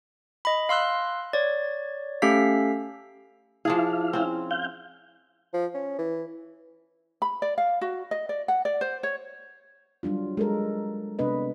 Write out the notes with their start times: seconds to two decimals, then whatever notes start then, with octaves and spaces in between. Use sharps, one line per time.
0.45 D#5 B5
0.69 F5 C6 E6 F#6
1.33 C#5 D5
2.22 A3 C#4 G4 A4 F5 B6
3.65 F3 D4 E4 G#4 F5
4.13 C4 C#4
4.51 F5 G6
5.53 F3
5.74 C#4
5.98 E3
7.22 B5
7.42 D5
7.58 F5
7.81 F#4
8.11 D#5
8.29 D5
8.48 F#5
8.65 D5
8.81 C5
9.03 C#5
10.03 F#3 G3 D4 F4
10.37 G#3 A4 A#4
11.19 C3 B3 D4 B4 D#5